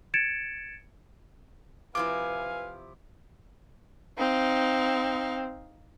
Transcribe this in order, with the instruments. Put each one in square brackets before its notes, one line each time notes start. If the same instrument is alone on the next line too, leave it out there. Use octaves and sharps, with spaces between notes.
[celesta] G#6 A6 C#7 D7 E7
[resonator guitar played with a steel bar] C3 F3 E4 [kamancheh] B4 G#5 [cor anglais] F5 [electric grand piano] D6
[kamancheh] C4 [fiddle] D#4 F5